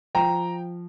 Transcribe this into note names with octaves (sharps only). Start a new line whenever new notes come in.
F3 G5 A#5